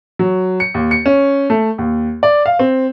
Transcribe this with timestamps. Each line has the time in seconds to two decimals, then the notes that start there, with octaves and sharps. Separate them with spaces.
0.19 F#3
0.60 C#7
0.74 D#2
0.91 C#7
1.06 C#4
1.50 A3
1.78 D#2
2.23 D5
2.46 F5
2.59 C4